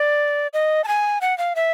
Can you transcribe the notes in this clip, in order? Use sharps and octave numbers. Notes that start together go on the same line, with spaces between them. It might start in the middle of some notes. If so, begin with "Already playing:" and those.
Already playing: D5
D#5
A5
G#5
F#5
F5
E5